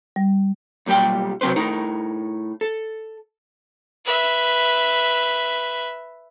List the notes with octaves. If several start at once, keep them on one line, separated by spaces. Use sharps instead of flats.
G3
B1 A#2 G3 G4 G5
C3 F#3 C4 B4 C5
A2 D#4 A#4
A4
B4 E5